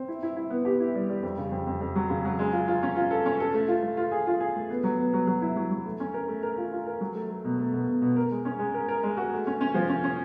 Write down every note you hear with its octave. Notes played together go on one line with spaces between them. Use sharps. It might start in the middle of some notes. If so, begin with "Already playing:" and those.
Already playing: C4
E4
E4
E4
B3
G4
E4
G3
G3
F2
C#3
F2
F2
F2
F#3
C#3
F#3
G#3
F4
F4
C#4
F4
A4
C#4
A4
A3
F4
A3
F4
G#4
F4
G#4
A3
B3
F#3
B3
F#3
F#3
E4
F#3
F#3
A3
C#4
A#4
A3
A#4
F4
F4
A#4
F#3
A3
A3
B2
A3
B2
B2
B2
A#4
G#3
C#4
G#3
A#4
A#4
G#3
F#4
A3
C#4
C#4
F3
C#4
C#4